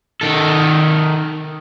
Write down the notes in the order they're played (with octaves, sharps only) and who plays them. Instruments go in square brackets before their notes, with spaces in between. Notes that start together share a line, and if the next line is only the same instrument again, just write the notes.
[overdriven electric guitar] D#3 A4